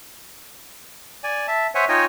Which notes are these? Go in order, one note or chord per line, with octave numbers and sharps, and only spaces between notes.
D5 G#5
E5 A5
C5 C#5 E5 F#5 G#5
D#4 F4 C#5 D#5 G5 G#5